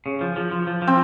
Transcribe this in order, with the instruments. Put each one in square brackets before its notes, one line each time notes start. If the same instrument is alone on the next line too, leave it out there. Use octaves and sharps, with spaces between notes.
[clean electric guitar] C#3
F3
F3
F3
F3
F3
[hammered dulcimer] C4